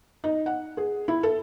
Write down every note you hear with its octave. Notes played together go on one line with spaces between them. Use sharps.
D#4
F#5
G#4
E4
A4